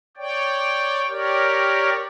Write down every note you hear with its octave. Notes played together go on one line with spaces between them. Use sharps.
C#5 D5 G5
G4 A#4 C#5 D5